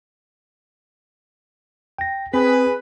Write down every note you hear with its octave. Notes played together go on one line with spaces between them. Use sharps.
G5 A#6
C4 G#4 B4